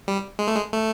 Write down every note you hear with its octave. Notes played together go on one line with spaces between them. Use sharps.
G3
G#3
A3
G#3
A3